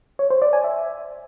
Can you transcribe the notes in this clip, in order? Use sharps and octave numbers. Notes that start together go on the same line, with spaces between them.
C#5
C5
D5
G#5
E5